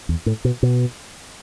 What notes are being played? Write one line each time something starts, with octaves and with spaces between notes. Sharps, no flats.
E2
A2
B2
B2